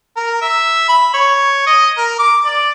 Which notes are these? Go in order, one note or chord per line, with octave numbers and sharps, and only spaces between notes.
A#4
E5
B5
C#5
D#5
A#4
D6
D5